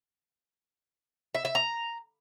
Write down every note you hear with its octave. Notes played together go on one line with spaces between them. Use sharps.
E5
E5
A#5